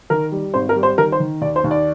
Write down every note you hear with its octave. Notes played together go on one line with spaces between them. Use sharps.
D#3 A#4
G3
G#1 C5
A#4
G3
C5
D#3 A#4
C5
D#3
D#2 D5
C5
D#2
D5